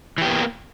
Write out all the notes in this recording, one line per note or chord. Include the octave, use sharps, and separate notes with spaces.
E3 A#3 B3 G4